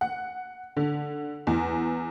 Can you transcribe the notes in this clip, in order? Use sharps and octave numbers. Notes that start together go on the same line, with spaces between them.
F#5
D3
E2